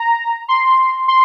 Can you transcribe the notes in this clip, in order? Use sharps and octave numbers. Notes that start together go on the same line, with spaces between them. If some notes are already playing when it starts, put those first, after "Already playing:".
Already playing: A#5
C6
C6